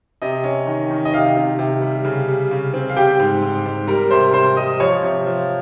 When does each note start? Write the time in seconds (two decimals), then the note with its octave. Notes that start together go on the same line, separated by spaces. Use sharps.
0.22 C3 D#5
0.44 C#4
0.67 D#3
0.91 D#3
1.05 D#5
1.14 C3 F5
1.36 C3
1.59 C3
1.81 G3
2.05 C#3
2.28 G3
2.51 C#3
2.74 C4
2.89 F5
2.96 G3 G4 G5
3.19 G#2
3.42 G#2
3.66 G#2
3.87 G3 A#4 A#5
4.10 C3 C5 C6
4.33 C3 C5 C6
4.57 G3 D#5 D#6
4.80 F3 C#5 C#6
5.03 C3
5.26 F3